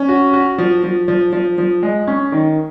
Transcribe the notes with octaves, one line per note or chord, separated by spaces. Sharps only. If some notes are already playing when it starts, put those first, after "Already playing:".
Already playing: C#4
F#4
F#4
F3
F3
F3
F3
F3
G#3
C#4
D#3